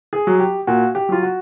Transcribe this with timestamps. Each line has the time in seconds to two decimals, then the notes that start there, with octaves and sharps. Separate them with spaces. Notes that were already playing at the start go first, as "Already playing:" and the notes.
0.13 G#4
0.27 F#3
0.40 G4
0.67 A#2 F#4
0.95 G4
1.09 F#3 F4
1.23 F#4